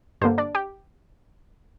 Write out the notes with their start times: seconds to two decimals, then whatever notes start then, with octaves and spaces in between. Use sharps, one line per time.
0.21 G2 D3 A#3 C5
0.38 D4 D5
0.55 G4 G5